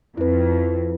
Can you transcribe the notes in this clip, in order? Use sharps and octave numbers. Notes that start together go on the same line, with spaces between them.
F2 E4 B4